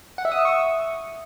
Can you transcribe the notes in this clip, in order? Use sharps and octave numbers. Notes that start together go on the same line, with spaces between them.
F#5
E5
D#6
E6
C#6